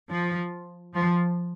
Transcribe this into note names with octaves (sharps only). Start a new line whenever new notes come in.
F3
F3